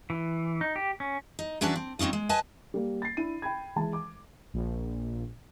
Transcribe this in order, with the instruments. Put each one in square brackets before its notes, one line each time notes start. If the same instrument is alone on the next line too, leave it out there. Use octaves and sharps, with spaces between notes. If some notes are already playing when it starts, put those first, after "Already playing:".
[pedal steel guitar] E3
D#4
G4
C#4
[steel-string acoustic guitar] D#4
E3 F#3 C#4 D4 B4 D5
C4
F#3 C4 C#4 D#4 F4
G#3
B4 D#5 G#5 A5
[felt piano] G3 A#3
A6 C7
D4 E4 D#7
G5 B5 G#6
E3 G#3 A5
D6
[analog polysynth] A#1